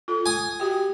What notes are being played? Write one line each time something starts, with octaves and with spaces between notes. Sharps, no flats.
F4 A4
G#5 D#6
F#4 G4 G5